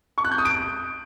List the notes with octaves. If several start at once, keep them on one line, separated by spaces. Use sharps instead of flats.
C#6
F#6
G6
D#6
D7